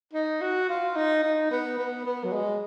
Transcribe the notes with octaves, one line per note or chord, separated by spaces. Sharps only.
D#4
F#4
F4
D#4
D#4
B3
B3
B3
F#3
G#3